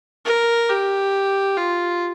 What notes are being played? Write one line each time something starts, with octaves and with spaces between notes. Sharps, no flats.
A#4
G4
F4